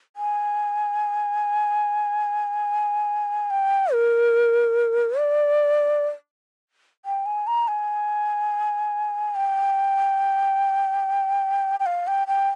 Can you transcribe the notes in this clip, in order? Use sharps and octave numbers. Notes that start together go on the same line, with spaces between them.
G#5
G5
A#4
D5
G5
G#5
A#5
G#5
G5
G5
F5
G5
G5